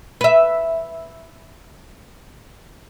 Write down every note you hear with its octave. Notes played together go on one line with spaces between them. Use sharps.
B4 E5